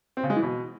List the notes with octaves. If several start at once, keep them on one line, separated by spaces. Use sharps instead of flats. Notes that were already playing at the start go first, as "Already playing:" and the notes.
C4
C#3
G#3
E3
B2